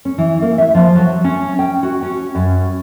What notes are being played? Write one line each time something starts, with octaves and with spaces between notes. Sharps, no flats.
C#4
E3
A#3
E5
F3
F#3
C#4
G5
F#4
C#4
F#2